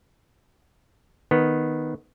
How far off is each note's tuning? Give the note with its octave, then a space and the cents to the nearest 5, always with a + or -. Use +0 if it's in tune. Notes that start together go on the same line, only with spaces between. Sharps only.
D#3 +0 B3 +0